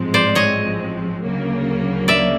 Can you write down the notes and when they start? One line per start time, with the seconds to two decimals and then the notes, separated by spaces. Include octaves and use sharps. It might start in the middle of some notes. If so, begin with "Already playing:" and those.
Already playing: A1 G#2 F3 G#3 C4
0.14 C5 D5
0.35 C#5 D#5
1.23 D2 C#3 F#3 A#3
2.08 D5 E5